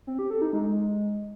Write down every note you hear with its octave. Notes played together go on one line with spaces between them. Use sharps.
C4
G4
A4
D#4
G#3